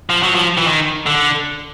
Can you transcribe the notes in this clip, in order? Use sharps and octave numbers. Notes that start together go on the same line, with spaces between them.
F3
F#3
F3
E3
D#3
D3